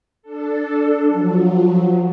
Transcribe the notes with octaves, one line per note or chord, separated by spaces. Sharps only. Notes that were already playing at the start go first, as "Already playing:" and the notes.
D4 A4
F3 F#3